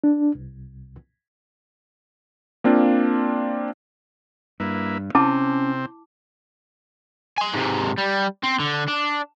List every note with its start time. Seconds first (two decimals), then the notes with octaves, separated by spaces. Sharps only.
0.04 D4
0.35 C2
2.64 A#3 C4 D4 F4
4.60 G2 A#3 E4 B4
5.15 C3 C4 C#4 E4 A5 D6
7.38 G#5 C6
7.54 G#2 C3
7.98 G3
8.44 C4
8.60 D3
8.88 D4